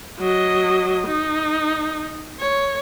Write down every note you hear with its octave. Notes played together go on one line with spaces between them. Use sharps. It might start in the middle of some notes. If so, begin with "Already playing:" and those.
F#3 D#5
D#4
C#5